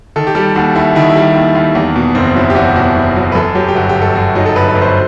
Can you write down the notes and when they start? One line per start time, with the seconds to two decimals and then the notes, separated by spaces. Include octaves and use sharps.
0.16 D#3 A4
0.27 G4
0.35 G3 A4
0.55 D#2 F#4
0.75 D#2 E4
0.96 D#3 E4
1.09 E4
1.16 G3
1.35 D#2
1.55 D#2
1.75 E2
1.96 B2
2.15 F#1 C4
2.35 F#3 E4
2.50 G4
2.55 E2 F#4
2.76 B2
2.96 F#1
3.16 F#3
3.32 B4
3.35 F#2 A4
3.55 F#3 G4
3.69 G4
3.75 G1 F#4
3.89 G4
3.95 G1
4.01 A4
4.15 F#2 F#4
4.35 F#3 D#4
4.46 A4
4.56 G1 B4
4.69 B4
4.75 G1
4.81 C5